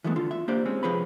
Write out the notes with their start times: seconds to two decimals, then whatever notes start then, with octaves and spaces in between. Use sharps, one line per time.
0.04 E3 F#3 G#3 A3 B3
0.16 D3 F4
0.31 E5
0.48 A#3 D4 G4 C5 D5
0.65 G#3 C4 C#4
0.83 C2 F3 G#4 B4 C#5 B5